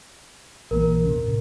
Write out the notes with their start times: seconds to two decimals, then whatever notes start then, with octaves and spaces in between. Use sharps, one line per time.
0.71 A#1 E3 A#3 A#4
1.04 E2 C3 C#4
1.25 A2